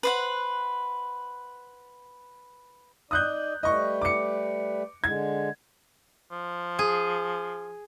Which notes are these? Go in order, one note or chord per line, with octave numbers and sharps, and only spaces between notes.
B4 C5 F#5
D#4 D5 D#6 F#6 G6
G3 A3 B4 D#5 C#6
D6 C#7
D3 G#3 G#6
F3
G#4